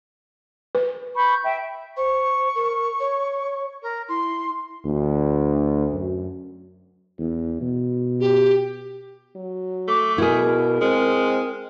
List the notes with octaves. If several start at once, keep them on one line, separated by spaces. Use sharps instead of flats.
B4
B5 C#6 G6
E5 G5
C5 C#6
A#4
C#5
A#4
E4 C6
D2
F#2
E2
B2
G4
F#3
A3 D6
B2 E4 G#4 A#4
G#3 C4